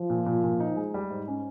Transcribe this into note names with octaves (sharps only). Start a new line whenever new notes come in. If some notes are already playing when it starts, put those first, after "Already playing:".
Already playing: F3
A#2
A#2
A#2
D#4
G#3
G3
G#2
C#4